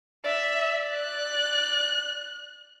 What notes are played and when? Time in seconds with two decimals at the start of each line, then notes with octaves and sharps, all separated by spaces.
0.25 D5 E5
0.93 F#6